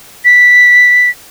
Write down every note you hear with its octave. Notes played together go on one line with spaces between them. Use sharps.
B6